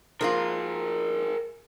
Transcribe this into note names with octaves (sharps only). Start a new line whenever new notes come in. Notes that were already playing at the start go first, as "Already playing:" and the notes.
F3 A#3 F4 G#4 A#4